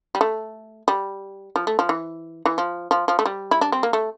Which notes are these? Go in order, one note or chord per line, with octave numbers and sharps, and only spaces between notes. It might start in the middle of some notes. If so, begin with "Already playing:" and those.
G3
A3
G3
F3
A3
F3
E3
E3
F3
F3
F3
A3
G3
E4
D4
C4
A#3
A3